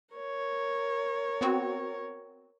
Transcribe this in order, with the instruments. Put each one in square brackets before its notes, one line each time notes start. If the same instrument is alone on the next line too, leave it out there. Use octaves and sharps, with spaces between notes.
[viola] A#4 C#5
[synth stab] B3 C4 F#4